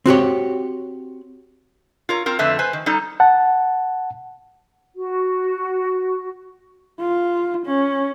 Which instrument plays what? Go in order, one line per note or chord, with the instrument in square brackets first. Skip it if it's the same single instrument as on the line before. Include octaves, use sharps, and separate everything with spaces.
[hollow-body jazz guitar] C4 F#4 G4 C#5
[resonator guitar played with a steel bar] F4 A#4 C#5
C4 F4 A#4
F2 D3 A3 B4 E5 A5
B4 C5 G#5
D#3
G3 D#4 A4
[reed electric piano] F#5 A5
[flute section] F#4
[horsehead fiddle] F4
C#4